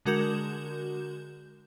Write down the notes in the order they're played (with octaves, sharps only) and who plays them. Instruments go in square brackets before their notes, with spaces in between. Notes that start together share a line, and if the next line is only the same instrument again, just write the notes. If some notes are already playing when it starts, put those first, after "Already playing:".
[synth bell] D3 G#3 F#4 A#4 G6 E7